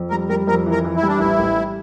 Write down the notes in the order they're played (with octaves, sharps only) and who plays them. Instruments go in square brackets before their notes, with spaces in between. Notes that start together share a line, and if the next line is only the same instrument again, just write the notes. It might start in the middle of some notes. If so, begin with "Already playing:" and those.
Already playing: [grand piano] F2
[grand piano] G3 [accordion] A#4
[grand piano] G3 [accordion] A#4
[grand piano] F2 [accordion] A#4
[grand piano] E3
[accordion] A#4
[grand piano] E3
[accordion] E4
[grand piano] G3
[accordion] D4
[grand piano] A1 [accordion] E4
[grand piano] A1
G3